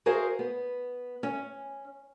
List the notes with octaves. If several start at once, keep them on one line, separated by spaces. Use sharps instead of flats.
F#4 G#4 A#4 C5 F5
B3
C#4